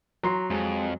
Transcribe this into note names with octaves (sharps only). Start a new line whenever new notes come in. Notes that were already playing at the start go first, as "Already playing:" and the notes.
F#3 A#5 C6 C7
F2 G#3